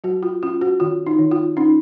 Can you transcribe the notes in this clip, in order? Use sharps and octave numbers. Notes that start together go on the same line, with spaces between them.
F#3 F#4
F4
C#4 F4
F#4
D#3 F4
D#4
D#3
F4
C#4 D#4